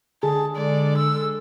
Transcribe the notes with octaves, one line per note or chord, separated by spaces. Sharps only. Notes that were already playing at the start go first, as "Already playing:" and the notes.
D3 G#4 A5
G#3 A4 D5
E6